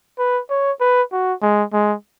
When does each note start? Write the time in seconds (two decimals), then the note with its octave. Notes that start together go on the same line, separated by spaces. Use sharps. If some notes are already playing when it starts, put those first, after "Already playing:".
0.19 B4
0.50 C#5
0.81 B4
1.12 F#4
1.42 G#3
1.73 G#3